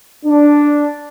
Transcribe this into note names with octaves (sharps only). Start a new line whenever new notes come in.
D4